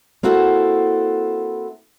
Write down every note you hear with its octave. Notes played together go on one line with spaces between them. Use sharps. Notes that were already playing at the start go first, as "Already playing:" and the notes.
A#3 C4 E4 F#4 A4